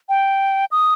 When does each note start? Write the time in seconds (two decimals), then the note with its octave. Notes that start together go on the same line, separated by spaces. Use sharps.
0.09 G5
0.71 D#6